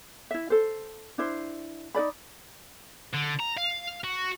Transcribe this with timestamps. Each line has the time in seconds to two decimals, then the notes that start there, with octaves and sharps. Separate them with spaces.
0.31 E4 E5
0.50 A4 C5
1.18 D4 E4 C5
1.95 D#4 A#4 D5 B5
3.13 D3
3.39 A#5
3.57 F5
4.04 F#4